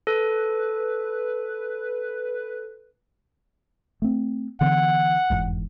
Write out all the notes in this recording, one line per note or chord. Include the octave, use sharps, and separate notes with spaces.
A4 B4
A3 C4
D3 E3 B3 F#5
F1 E2 G#2